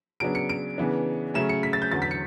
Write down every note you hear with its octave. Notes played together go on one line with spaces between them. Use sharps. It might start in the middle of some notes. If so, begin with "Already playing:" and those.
C#3 F#3 B3 D4 D7
C#7
D7
C#3 E3 B3 D4
C#3 F#3 A3 C#4 E7
C#7
B6
A6
G6
E2 D3 F#3 A6
B6
C#7